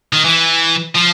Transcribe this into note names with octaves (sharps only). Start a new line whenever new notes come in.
D#3
E3
F3